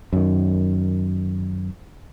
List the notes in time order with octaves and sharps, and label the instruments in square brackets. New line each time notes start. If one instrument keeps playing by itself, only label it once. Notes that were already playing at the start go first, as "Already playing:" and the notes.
[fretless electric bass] F#2 D#3